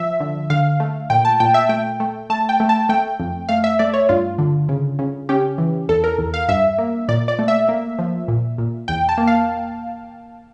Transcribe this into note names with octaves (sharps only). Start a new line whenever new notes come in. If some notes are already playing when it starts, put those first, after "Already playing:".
Already playing: F3 E5
D3
D3 F5
A3
A#2 G5
A5
A#2 G5
E5
A3 G5
A3
A3 A5
G5
A3
A5
A3 G5
F2
A3 F5
E5
A3 D5
C#5
G2 F4
D3
C#3
C#3
C#4 G4
E3
E2 A4
A#4
E2
F5
G2 E5
A#3
A#2 D5
D5
A3
E5
A#3
F3
A#2
A#2
E2 G5
A5
A#3
F5